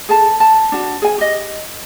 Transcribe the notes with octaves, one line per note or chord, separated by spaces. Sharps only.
G#4 A4 A5
A5
D4 F#4
G#4 G#5
G4 D#5